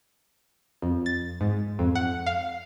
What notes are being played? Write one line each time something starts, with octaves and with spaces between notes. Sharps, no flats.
F2
A6
G#2
F2
F#5
F5